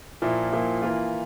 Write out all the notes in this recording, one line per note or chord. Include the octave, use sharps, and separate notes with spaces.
A#2 F3 A#3 E4
A#2 F3 A#3 E4
E3 A#3 F4